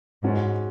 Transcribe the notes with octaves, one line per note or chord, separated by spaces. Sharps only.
G#2 G#3 C#4 F#4